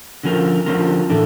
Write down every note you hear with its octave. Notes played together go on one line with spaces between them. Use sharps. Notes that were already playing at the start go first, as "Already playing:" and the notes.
D3 F3 C#4 F4 A#4
D3 F3 C#4 F4 A#4
A2 E3 D4 A4